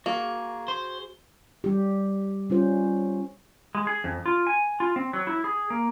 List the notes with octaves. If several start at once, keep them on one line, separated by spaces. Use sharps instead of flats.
A#3 F#4 G#4
C5
G3 G4
G3 C#4 F4 C5
G#3
G#4
F2
F4
G#5
F4
C4
F#3
E4
G#4
A#3